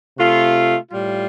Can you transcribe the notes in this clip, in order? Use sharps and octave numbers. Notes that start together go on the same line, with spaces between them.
C3 A3 F4
A2 G3 F4